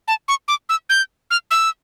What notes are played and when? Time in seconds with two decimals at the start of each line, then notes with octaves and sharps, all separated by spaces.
0.08 A5
0.28 C#6
0.48 D6
0.69 E6
0.90 G6
1.31 F6
1.51 E6